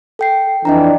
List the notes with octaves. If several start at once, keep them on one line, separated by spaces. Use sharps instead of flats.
A4 G5 C7
F2 E3 D4 D#5 G5 A#5